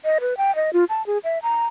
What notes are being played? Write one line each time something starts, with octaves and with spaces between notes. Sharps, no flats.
D#5
B4
G5
D#5
F4
A5
G#4
E5
A#5